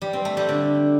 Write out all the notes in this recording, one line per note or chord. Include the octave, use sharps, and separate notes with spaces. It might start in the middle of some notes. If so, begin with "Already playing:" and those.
G3
C4
A3
G3
D3